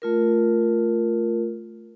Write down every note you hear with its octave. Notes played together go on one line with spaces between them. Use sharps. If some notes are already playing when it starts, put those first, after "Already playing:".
A3 F4 A#4